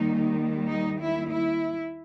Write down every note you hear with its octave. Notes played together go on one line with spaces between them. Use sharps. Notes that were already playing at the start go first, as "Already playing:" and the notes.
Already playing: D#2 D#3 G3 D#4
D#4
E4
E4